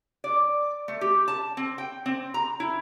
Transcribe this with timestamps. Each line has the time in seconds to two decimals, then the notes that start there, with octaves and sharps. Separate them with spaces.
0.24 D5
0.88 A3
1.01 G4
1.28 A5
1.57 C4
1.78 G5
2.06 C4
2.34 A#5
2.60 E4